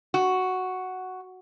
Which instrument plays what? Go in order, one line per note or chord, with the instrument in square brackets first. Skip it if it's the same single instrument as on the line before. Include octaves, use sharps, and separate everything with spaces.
[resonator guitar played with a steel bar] F#4